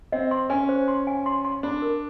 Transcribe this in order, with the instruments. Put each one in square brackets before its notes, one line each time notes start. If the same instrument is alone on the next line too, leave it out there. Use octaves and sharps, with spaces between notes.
[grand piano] C4 [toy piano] D#5
[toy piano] C6
[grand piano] C#4 [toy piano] G#5
[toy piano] C5
C6
G#5
C6
C6
[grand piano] D4 [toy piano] B5
[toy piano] A#4